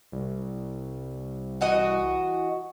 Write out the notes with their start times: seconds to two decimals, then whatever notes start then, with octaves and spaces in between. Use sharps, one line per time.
0.12 C2
1.61 E3 F#4 D#5